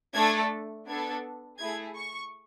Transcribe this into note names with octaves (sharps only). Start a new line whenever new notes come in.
A3 D4 A4 G#6
B3 D4 A4 G#6
A3 E4 G#4 G#6
C#6